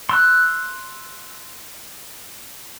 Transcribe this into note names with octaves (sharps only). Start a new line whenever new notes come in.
C6 E6 F#6